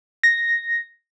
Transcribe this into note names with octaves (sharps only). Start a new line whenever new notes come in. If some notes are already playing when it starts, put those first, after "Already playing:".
A#6